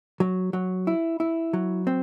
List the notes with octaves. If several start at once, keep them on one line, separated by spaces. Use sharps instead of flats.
F#3
F#3
E4
E4
F#3
C4